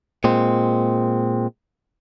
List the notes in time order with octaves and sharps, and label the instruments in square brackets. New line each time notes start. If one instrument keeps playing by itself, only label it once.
[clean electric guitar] A#2 G#3 C4